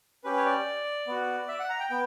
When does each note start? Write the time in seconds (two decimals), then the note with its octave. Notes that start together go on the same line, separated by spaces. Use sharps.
0.24 C#4 G4 B4
0.37 C#5
0.45 D5
1.07 B3 F#4
1.48 E5
1.59 F#5
1.69 A#5
1.80 G5
1.90 B3 G5